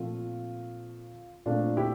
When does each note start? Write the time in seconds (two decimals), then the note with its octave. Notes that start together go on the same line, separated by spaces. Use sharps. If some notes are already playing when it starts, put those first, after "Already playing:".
Already playing: A#2 F3 A3 C4 F4
1.46 A#2 A3 C4 D4 F4
1.77 E4 G4